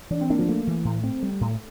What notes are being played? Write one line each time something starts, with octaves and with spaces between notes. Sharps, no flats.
E3 D4
C4
A#3 D4
F3
A3 A#3
E3
A2
C4
G3
A2